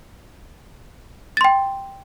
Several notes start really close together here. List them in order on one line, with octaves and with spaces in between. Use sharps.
A6 C6 G5